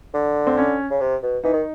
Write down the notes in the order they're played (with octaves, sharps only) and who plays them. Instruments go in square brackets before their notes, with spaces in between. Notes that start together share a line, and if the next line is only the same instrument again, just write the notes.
[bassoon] D3
[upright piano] C4
C#4
[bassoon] C#3
C3
B2
[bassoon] E3 [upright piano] D#4
[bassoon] D#3